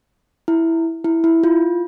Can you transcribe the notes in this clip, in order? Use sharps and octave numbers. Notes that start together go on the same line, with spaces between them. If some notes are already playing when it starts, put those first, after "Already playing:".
E4
E4
E4
F4